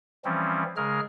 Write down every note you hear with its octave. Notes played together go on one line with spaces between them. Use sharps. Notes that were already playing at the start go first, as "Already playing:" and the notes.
E3 F3 G3 C4 C#4
C#3 G#3 G#4 A#4 F6